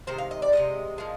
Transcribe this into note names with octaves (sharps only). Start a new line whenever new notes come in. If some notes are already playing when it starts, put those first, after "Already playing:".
C3 D#3 G#3 C5
F5
D#5
D5
C3 F3 G#3 D#5
A#2 F3 G#3